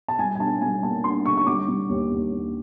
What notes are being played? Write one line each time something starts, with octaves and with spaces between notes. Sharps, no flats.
A5
G3 G#5
G#5
D4 A5
G3 G#5
A#3 A5
D4 C6
D3 C#6
C#6
G3 D6
G3
D#2
D#2
D#2